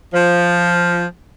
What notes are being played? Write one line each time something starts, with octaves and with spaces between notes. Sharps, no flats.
F3